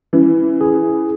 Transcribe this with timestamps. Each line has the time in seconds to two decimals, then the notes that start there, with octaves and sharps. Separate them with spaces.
0.13 E3 C#4
0.61 G#4